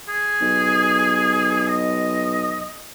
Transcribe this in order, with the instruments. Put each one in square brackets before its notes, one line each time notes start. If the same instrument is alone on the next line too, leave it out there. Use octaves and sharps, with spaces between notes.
[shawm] G#4
[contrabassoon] B1
[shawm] D#5